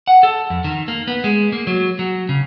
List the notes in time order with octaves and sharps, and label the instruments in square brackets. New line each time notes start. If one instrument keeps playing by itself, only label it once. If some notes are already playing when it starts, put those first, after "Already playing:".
[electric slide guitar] F#5
A4
F2
D#3
A#3
B3
G#3
A#3
F#3
F#3
C#3